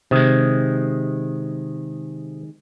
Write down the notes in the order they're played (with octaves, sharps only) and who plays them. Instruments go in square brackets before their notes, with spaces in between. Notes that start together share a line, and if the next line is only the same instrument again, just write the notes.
[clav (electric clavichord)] C3 [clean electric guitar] D#3 G#3